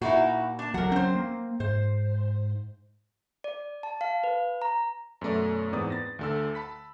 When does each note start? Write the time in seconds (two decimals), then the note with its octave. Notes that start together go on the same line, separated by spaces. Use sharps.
0.02 A#2 D#4 E4 F#4
0.59 D4 A5
0.74 C#2 F#3 A#4 F#5
0.92 F#3 C4 C#4 C5
1.16 A#3
1.60 G#2 C5
3.44 D5
3.83 A5
4.01 F5
4.24 B4
4.62 A#5
5.21 F#2 B2 A3 D5
5.73 E2 G#2 B3 C4 D5 D#6
5.90 B4 A6 A#6
6.19 D2 D3 E6
6.55 A5 B5 B6